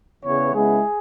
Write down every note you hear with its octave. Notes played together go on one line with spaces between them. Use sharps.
E2 C#3 E3 B3 C#5
C#3 G#3 B3 E4 G#4